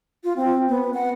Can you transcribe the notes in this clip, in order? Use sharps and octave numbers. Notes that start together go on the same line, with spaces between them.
F4
C4
B3
F#5